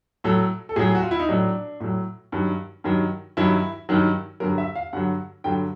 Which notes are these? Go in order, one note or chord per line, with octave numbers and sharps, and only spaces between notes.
A2 F#3 A4
A4
A2 F#3 G#4
F#4
F4
E4
D#4
A2 F#3 D4
A2 F#3
G2 D#3 F#3
G2 D#3 F#3
G2 D#3 F#3 E4
G2 D#3 F#3
G2 D3 F#3 A#4
E5
F5
G2 D3 F#3 F#5
G2 D3 F#3 G5